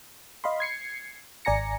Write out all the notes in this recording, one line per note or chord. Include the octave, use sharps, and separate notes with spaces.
D#5 F5 B5 C6
G#6 C7 C#7
G#1 D5 G#5 A#5 A#6 C#7